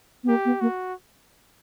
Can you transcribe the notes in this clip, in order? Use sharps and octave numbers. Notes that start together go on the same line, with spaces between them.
B3
A#3 G4
B3
A#3 F#4